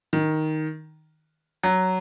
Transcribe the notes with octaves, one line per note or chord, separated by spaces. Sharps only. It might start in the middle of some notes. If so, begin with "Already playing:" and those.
D#3
F#3